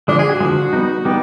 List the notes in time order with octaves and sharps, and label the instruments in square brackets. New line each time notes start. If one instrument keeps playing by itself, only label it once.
[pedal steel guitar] D3 F3 G#3 [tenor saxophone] D4
[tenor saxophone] G#4
F#4
[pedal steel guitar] D3 F3 G#3
G3 B3 D#4
[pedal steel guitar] G3 B3 D#4 [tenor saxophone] G4